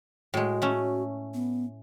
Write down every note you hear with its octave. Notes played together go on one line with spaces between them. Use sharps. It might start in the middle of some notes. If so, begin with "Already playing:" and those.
A2 G#3 F#4
A3 C#4
B3